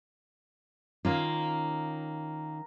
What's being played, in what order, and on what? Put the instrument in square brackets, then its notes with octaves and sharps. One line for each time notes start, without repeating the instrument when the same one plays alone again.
[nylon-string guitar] D#3 C#4 F4 [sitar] A#3